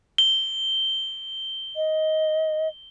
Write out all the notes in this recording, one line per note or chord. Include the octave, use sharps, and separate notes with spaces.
G7
D#5